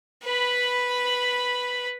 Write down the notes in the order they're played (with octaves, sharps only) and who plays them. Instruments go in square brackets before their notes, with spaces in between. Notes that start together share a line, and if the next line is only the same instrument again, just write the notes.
[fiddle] B4 B5